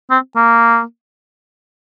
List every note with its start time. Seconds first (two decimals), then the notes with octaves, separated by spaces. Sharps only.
0.10 C4
0.36 A#3